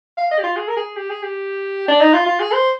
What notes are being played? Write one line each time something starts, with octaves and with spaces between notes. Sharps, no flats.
F5
D#5
G4
F4
G#4
A#4
G#4
G4
G#4
G4
D4
D#4
F4
F4
G#4
C5